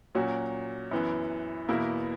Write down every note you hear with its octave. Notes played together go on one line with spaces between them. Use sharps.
A#2 F#3 C#4 F#4
F#2 E3 B3
E2 B2 A#3 E4